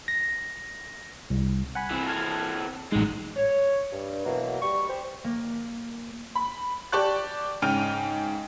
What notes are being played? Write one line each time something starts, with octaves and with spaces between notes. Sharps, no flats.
A#6
C2
F#5 G#5 B5
E3 C4
A5 F6 G#6
A1 G#2 F#3 G#3
C#5
G2
B2 E3 F#3 A#3
G3 C#6
G4 C5
A#3
B5
G4 D5 A5 C#6 F#6
G#2 C#3 G5 F6 D#7